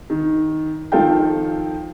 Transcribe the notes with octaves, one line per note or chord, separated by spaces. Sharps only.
D#3
D#3 F3 A4 F5 G5